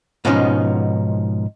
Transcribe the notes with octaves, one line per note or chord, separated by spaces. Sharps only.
G#2 B2 F3 B3 C#4 D#4